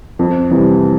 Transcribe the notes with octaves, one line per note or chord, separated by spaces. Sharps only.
F2
C3 E3 G3